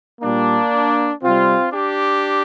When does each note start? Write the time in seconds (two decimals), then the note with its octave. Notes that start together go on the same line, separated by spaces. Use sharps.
0.22 A#2 G3 A#3 D4
1.21 C3 G3 C4 F4
1.71 D4 G4